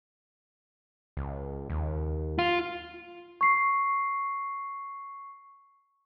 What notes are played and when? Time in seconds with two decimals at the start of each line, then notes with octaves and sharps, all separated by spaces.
1.17 C#2
1.70 D#2
2.39 F4
3.41 C#6 C7